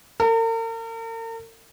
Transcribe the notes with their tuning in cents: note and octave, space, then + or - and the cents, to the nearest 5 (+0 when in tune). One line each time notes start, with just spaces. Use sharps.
A#4 -45